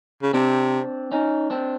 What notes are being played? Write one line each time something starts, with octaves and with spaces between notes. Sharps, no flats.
C#3
C3 C4 D4
C#4 D#4
C4 D4